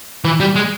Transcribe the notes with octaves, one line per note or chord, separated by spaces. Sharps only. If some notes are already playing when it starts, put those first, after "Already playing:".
E3
G3
G#3